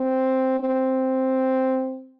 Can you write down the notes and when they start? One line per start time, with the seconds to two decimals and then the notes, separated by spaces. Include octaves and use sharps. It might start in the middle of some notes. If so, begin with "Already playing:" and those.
Already playing: C4
0.60 C4